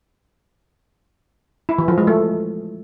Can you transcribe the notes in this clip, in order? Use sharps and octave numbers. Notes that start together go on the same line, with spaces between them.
E4
E3
F3
G#3
A3